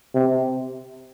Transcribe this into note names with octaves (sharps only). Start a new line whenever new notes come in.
C3